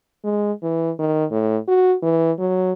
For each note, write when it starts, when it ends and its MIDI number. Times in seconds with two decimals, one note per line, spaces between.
0.24 0.52 56
0.63 0.92 52
0.99 1.25 51
1.31 1.58 45
1.68 1.95 66
2.02 2.32 52
2.38 2.72 54